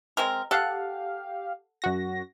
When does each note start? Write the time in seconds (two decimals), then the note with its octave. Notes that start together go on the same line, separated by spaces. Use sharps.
0.17 G#3 C4 A#4
0.51 G4 A4 F5 F#5
1.82 F#2 F#4 A#6